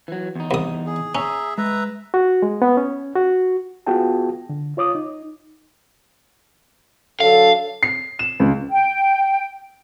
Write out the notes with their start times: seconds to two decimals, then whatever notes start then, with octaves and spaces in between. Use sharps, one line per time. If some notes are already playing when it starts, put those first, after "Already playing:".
0.08 E3 F#3
0.35 E2 D#4
0.51 C2 D#6
0.86 G#4
1.15 C#4 G#4 E5 A#5
1.58 G#3 B4 E5 A#5
2.14 F#4
2.42 G#3
2.62 B3
2.77 C#4
3.15 F#4
3.87 B3 F4 F#4 G#4 G5 A5
4.49 D3
4.77 F4 C#5 D6 D#6
4.95 D#4
7.20 D3 F#3 A4 F5
7.83 C7
8.19 E7
8.40 C#2
8.69 G5